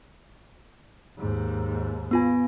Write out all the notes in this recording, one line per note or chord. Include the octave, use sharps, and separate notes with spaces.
D#2 G#2
B3 F4 G#5